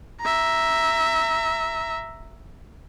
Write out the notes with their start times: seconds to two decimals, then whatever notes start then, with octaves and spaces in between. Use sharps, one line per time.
0.21 E5 A#5